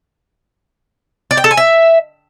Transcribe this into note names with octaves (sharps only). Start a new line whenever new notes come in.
D5
G5
A4
G#5
E5